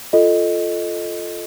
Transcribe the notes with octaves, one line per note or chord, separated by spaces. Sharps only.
F4 A4 D#5